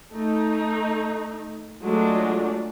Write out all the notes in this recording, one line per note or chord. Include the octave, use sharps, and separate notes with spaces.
A3 D#4
F#3 G#3 A3 D4 F4